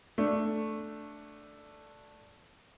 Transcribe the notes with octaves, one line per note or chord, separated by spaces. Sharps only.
A3 D4